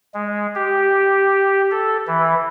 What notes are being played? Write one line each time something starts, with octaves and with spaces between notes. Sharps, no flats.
G#3
G4
A4
E3